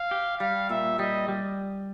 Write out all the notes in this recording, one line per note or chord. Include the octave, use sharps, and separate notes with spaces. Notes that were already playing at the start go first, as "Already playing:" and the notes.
Already playing: F5
G4
G3 F5
A#2 E5
G3 D#5
G3